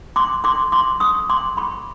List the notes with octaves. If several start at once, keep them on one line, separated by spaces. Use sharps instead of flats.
C6 D6
C6 D6
C6 D6
C#6 D#6
C6 D6
B5 C#6